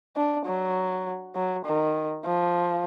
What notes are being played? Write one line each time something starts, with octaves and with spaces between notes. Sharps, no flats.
D4
F#3
F#3
D#3
F3